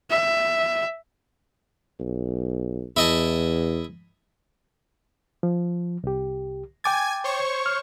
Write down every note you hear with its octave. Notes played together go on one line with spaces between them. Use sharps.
E5
B1
E2 E4 D#5 A5
F3
C2 G4
G5 G#5 D6 G#6 A6
C5 C#5 C#6
F6